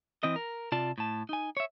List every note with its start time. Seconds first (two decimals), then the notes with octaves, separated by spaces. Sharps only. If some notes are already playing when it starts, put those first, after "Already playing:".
0.23 E3 C4 D#5
0.36 A#4
0.72 C3 F4 D5 A5
0.98 A2 A5
1.29 D#4 G#5
1.57 C#5 E5